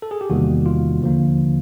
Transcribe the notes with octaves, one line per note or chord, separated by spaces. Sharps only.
A4
G#4
G4
E2 C3 D#3 G3 A#3 F#4
F4
D#2 D3 F3 A#3